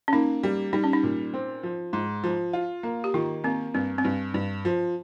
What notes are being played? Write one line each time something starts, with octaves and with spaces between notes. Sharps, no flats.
C#4
A#3 D#4
G3
G3 D#4
C#4
D#4
A#2
C4
F3
G#2
F3
F4
A#3
G4
D#3 F4
A#3 C4
G2 C4
C4
G2
G2
F3